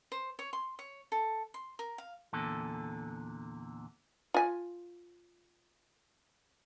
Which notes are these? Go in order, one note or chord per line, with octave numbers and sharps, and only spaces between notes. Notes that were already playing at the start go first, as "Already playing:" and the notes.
C5
C#5
C6
C#5
A4
C6
A#4
F5
E2 A#2 D3 A4
F4 G#5